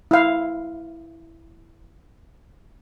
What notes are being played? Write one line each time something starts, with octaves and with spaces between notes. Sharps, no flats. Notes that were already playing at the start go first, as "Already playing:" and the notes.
E4 F5